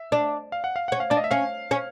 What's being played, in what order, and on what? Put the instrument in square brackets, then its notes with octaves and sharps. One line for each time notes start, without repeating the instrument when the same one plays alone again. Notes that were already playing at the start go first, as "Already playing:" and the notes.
Already playing: [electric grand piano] E5
[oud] D4
[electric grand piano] F5
F#5
F5
[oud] C#4 [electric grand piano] F#5
[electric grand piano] F5
[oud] D4 [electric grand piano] D5
[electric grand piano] D#5
E5
[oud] C#4 [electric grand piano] F5
[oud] C#4